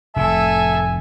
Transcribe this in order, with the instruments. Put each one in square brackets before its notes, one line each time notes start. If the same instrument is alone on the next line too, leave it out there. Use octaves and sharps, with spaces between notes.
[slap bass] F1 A2 [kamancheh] A4 E5 [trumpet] G#5